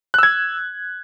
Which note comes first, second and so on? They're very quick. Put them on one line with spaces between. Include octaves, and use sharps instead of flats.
F#6 E6 G#6